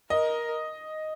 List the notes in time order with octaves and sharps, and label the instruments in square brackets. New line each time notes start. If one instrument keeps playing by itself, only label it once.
[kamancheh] A#4 [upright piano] D#5